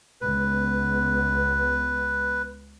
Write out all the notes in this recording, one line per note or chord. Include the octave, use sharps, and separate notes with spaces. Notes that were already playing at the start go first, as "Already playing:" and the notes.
C#2 G#3 B3 B4